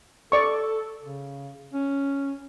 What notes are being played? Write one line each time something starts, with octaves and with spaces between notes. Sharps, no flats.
A4 D5 C#6
C#3
C#4